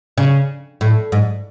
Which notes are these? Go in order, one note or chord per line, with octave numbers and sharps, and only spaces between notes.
C#3
A2
G#2